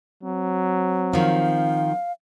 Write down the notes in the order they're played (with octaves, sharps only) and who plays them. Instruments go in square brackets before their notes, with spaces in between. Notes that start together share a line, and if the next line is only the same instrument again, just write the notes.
[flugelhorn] F#3 [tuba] C4
[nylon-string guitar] D#3 F3 [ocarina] F5